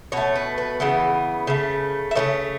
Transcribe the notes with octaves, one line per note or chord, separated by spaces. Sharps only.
B2 A3 C#5
B4
B4
C#3 E3 B3
C#3 A3
E5
C#3 E3 A3 C#5